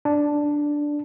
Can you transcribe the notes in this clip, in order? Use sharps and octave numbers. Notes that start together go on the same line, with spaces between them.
D4